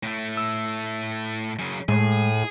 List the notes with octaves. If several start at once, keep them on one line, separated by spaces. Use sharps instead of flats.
A2 A3
E6
F#2 C#3
A2 G#3 G#4